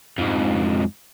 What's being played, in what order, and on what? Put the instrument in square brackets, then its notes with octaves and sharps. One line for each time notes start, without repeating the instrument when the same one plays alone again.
[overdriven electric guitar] F2 G#2